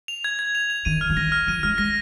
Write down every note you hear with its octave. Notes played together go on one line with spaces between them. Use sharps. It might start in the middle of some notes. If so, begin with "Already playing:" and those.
F7
G#6
G#6
F7
F7
D#3 D#7
F6
F3
D#3 A#6
F6
F3 D#7
G#3 F6
G#3 A#6